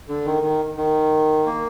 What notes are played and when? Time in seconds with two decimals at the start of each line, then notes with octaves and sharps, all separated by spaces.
0.08 D3
0.26 D#3
0.43 D#3
0.77 D#3
1.46 A#3